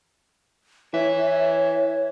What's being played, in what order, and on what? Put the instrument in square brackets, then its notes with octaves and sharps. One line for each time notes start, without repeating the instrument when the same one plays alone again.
[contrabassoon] E3 [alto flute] C#5 [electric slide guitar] E5